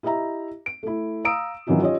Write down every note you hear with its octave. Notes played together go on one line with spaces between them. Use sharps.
E4 G4 D#5 E5 A#5
D7
A3 E4
F5 A#5 D#6 E6 D7
D#3 E3 F#3 C#4 D#4 F4
C#4 F4 G4 C#5 D#5